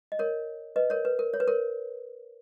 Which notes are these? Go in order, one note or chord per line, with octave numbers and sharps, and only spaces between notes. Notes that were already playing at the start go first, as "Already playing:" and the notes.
D#5
A#4 C#5
B4 D#5
A#4 C#5
B4
A#4
C#5
B4
A#4 C#5